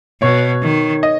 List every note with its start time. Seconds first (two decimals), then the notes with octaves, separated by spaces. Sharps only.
0.21 B2 C#5
0.62 D#3
1.03 D#5